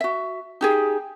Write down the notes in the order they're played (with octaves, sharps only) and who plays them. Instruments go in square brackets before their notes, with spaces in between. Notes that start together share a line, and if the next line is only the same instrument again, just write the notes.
[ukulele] F#4 E5
D#4 G4 G#4